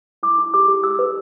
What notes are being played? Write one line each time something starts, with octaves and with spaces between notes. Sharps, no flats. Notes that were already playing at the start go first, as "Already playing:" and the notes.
E4 D6
E4
G4 D6
G4
G4 E6
B4